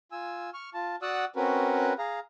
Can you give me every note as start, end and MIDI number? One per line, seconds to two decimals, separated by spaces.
0.12 0.50 65
0.12 0.50 80
0.12 0.50 88
0.54 0.70 85
0.54 0.70 89
0.74 0.96 65
0.74 0.96 81
1.02 1.25 66
1.02 1.25 74
1.02 1.25 78
1.02 1.25 87
1.02 1.25 88
1.02 1.25 90
1.36 1.93 60
1.36 1.93 61
1.36 1.93 66
1.36 1.93 70
1.36 1.93 71
1.98 2.20 68
1.98 2.20 77
1.98 2.20 82